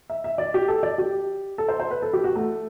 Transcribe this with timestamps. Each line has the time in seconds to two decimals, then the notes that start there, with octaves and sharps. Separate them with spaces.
0.10 E5
0.24 E5
0.38 D5
0.54 G4
0.68 A4
0.83 D5
0.98 G4
1.58 A4
1.68 C5
1.80 C5
1.91 B4
2.02 A4
2.13 G4
2.24 F#4
2.35 A3